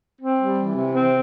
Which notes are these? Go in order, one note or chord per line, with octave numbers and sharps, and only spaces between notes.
C4
G3
E3
C3
C4